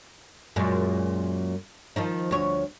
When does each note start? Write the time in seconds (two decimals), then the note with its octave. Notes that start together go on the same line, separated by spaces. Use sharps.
0.56 F#2 A#2 G#3
1.96 D#3 F3 D#4
2.31 D2 C#5